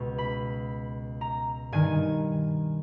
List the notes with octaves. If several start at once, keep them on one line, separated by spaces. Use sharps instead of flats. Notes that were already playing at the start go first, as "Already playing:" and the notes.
Already playing: C#2 B2
B5
A#5
G2 D#3 G#5